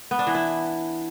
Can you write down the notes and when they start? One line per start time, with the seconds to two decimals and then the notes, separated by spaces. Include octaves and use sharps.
0.11 B3
0.19 D4
0.27 E3
0.35 E4